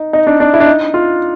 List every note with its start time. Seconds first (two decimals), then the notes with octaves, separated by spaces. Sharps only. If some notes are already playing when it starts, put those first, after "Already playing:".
Already playing: D#4
0.13 D#4
0.27 D4
0.40 D4
0.54 E4
0.60 D4
0.66 D#4
0.94 F4